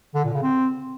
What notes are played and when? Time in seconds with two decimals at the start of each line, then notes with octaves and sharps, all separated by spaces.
0.15 D3
0.24 A#2
0.34 C#3
0.43 C4